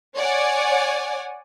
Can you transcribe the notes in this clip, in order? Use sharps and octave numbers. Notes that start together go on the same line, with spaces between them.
C#5 D5 F#5 G#5